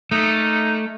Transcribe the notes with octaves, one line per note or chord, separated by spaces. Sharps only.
A3 A#3 D#4